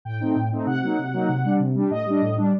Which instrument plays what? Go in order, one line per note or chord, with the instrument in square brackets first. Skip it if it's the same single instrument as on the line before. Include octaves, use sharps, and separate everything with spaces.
[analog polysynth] A2 G5
A3 C4 D#4
A2
A3 C4 D#4
C3 F#5
F#3 A#3 D#4
C3
F#3 A#3 D#4
C3
G3 D4
C3
G3 D4
A2 D#5
G3 D4
A2
G3 D4